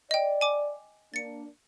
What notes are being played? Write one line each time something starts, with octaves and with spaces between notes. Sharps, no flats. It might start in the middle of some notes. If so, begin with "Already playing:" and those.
D5 D#5 G5
G#5 D6
A#3 D4 A6 C#7